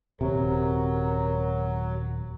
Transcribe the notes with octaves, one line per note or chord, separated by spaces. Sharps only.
D#1 C3 F#3 A#4